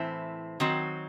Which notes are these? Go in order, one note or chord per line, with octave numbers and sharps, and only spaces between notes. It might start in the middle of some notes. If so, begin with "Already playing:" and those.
Already playing: A2 E3 C4 E4 C5
D#3 F#3 C4 F#4